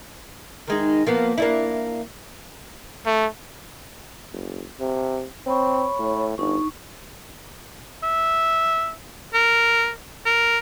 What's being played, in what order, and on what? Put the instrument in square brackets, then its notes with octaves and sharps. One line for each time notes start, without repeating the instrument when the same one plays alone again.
[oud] D#3 G#3 D#4
F3 A#3 B3
A#3 D4 E4
[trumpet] A3
[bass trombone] F#1
C3
[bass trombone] C4 [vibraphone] C#5 B5 C#6
[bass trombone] A2
[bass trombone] G1 [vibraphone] D#4 C#6
[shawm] E5
A#4
A#4